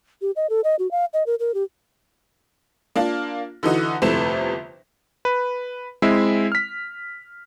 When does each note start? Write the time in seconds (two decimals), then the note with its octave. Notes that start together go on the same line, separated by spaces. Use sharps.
0.22 G4
0.36 D#5
0.50 A4
0.64 D#5
0.79 F#4
0.91 F5
1.13 D#5
1.27 A#4
1.40 A#4
1.54 G4
2.96 A#3 D4 F4
3.63 D3 E3 D#4 F#4
4.02 G1 F2 C3 A3 E4 E7
5.25 B4
6.02 G#3 C4 E4 E5
6.52 F6 B6